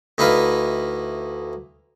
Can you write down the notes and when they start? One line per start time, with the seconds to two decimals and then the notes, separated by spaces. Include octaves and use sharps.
0.18 D2 D#4 E4 B4 F5